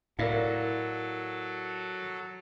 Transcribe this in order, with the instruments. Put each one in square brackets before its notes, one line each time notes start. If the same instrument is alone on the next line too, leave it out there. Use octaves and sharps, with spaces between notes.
[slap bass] A2 [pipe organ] F#3 A4 [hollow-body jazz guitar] E4 [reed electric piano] A#4 D5 F5